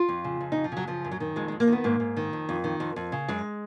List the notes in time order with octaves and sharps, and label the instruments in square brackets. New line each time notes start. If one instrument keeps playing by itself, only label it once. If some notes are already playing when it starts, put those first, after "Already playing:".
Already playing: [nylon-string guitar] F4
F2
C#3
F2
F2 D#4
F3
C#3 F#3
F#2 F3
F#2
F#3
D#3
F2 G#3
F2 G#3
A#3
D#3 B3
G#2 A#3
G#2
D#3
F2
F2
D#3
F2
F2
C#3
F#2 G#3